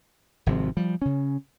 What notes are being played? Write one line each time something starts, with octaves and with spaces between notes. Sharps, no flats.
G#1 C3 F3 C4
F3 G3
C#3 C#4